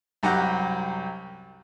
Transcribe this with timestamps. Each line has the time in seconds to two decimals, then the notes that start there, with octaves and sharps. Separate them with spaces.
0.23 C2 F#2 G4 F#5 A#5